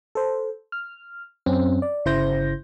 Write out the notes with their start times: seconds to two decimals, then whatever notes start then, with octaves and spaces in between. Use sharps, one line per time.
0.15 A4 C5
0.72 F6
1.46 F#2 C4 C#4
1.82 D5
2.05 G1 C#3 E4 C5 G6 A#6